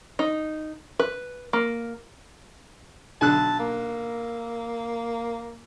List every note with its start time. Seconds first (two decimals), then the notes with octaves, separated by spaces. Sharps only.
0.19 D#4
0.99 B4
1.53 A#3
3.21 B1 D3 A5 F#6
3.59 A#3